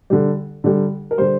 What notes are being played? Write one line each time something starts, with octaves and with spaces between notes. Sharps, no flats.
D3 G3
D3 G3
A#4
D3 G3 C5